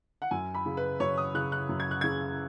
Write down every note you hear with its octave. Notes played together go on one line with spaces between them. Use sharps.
F#5
F#2 G#5
B5
C#3
B4
F#2 C#5
D#6
C#3 F#6
F#6
F#2
G#6
F#6
C#3 G#6